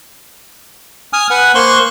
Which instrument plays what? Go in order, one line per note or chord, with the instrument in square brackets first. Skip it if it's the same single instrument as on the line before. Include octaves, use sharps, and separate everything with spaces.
[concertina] G#5 D#6 F6
B4 F#5 G#5
A#3 C5 C6 C#6 F#6